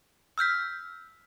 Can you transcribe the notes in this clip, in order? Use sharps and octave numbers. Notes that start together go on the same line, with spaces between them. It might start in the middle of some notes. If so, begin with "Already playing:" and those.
E6 F6 G6 B6